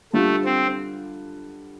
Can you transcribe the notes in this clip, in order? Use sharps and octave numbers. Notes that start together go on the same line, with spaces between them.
D3 G3 A3 F4
C4